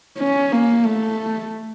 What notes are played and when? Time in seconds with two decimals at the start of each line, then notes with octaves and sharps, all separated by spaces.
0.18 C#4
0.52 A#3
0.85 A3